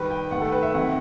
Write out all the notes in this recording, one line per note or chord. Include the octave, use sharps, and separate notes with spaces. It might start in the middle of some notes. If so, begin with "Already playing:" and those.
Already playing: D#3 G3 B4
G5
D#3 A3 F#5
A4
B4
E5
C3 D#3 F#3 F#5